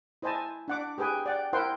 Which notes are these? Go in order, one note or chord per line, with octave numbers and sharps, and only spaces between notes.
E4 C5 D#5 G#5 A5
D4 F#5 D6
G4 G#4 B4 G5 G#5
D5 F#5 G5
E4 A#4 C5 F#5 G5 C6